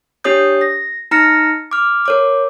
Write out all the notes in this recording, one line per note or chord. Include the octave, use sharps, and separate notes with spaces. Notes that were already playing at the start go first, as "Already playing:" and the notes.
D4 G4 C#5 D#6 G6
A#6
D#4 A#5 F6 A#6 C#7
D6 F6
A#4 C#5 D6